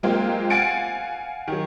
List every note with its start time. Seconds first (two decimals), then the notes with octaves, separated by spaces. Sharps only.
0.03 F#3 G#3 A#3 C4 F4 G4
0.50 F5 F#5 G#5 A6 C#7 D7
1.48 D#3 F#3